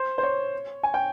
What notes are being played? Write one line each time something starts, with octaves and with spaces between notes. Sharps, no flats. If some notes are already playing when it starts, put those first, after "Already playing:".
Already playing: C5
C5
C#5
G#5
G5